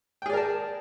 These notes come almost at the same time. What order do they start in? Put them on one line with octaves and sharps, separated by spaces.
G5 G#4 D5 A#4 A5